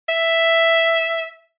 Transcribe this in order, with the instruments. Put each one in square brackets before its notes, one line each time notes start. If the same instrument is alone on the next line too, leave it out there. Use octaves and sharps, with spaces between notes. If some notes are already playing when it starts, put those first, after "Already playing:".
[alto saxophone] E5